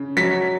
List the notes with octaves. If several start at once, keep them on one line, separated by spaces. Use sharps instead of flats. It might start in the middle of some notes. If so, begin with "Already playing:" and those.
Already playing: C#3
F#3 B6